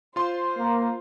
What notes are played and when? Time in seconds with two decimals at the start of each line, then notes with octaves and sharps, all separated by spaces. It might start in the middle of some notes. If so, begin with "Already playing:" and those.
0.16 F4 C5 C6
0.57 A#3